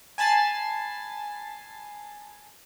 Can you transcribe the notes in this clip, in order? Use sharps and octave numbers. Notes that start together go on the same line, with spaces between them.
G#5 A5 B5 A6 C7